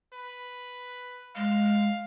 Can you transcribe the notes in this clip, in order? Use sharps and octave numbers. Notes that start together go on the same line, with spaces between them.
B4
G#3 F5